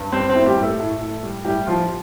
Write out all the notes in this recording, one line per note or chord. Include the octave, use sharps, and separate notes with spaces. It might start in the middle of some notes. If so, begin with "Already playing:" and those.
Already playing: G2
G3 C4 C5
C4 C5
A2
G3 G4
A2
A3 A4
A2
A2
G3
A2 G3 G4
F3 G3 F4